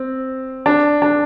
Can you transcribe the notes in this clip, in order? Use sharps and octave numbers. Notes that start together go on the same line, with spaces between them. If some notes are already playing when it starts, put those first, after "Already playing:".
Already playing: C4
D4
D4